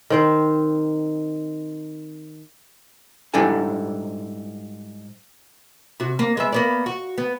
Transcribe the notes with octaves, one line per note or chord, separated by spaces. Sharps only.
D#3 C4 C5
G#2 G3 D4 E4 A4 G#5
C3 F#4
A#3
G#3 B3 E5
A#3 B3 D5
F#4
B3